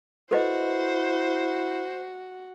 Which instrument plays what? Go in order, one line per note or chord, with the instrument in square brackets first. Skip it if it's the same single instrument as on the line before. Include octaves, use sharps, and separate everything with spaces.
[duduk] E4 [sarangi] F#4 [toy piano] A4 B4 D#5 [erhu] C5